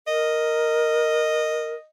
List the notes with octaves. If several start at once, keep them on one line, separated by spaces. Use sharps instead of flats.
A#4 D#5